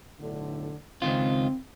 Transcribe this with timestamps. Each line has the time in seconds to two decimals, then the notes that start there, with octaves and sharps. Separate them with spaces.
0.20 B1 A2 D3
1.02 C#2 D#3 C4 F4